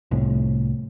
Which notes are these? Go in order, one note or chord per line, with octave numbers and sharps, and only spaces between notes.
C2 A2